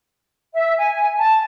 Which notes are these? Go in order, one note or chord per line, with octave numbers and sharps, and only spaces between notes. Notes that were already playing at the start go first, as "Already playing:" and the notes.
E5
G#5
A5